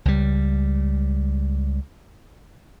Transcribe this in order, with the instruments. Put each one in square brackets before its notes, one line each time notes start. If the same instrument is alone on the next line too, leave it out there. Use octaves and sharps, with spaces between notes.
[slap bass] C#2 G3